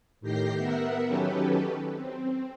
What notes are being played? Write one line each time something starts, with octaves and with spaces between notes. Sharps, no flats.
A2 D#3 G4 G6 A#6 C7
B3 A#4 E5 F#5
D#3 F#3 C#4 G4 A4 B4
C4